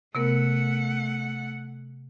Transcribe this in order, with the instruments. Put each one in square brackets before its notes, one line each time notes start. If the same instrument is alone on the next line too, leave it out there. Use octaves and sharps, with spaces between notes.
[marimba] C3 B3 A#4 [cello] A3 F#5